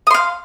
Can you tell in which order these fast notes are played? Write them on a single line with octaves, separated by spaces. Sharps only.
D#6 C6 F5